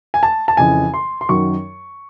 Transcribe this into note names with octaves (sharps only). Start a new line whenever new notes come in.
G#5
A5
A5
F2 C#3 E3 G#5
C6
C6
F#2 D#3 F#3 C#6